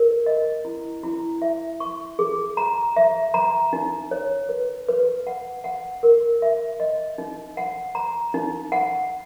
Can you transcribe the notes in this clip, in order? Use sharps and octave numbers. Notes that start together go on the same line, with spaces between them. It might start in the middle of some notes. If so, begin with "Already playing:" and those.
Already playing: A#4
D#5
E4
E4
E5
C#6
G#4
A#5
E5
A#5
D#4
C#5
B4
B4
F#5
F#5
A#4
E5
D#5
D#4
F#5
A#5
D#4
F#5